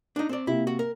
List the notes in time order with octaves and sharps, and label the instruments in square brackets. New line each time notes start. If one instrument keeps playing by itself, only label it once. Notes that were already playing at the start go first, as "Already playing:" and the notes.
[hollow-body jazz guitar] D4 D#4
C4 D5
[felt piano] C3 A#3 [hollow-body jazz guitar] E4
[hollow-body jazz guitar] F#4
A#4